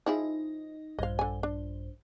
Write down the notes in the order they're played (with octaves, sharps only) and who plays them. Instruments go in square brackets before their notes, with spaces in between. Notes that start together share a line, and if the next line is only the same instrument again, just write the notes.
[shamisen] F3 E4 G#4 [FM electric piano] D#4 D#5
[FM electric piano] A#1 G2 C5 [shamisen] D#5 F5
[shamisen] D3 G#5
D4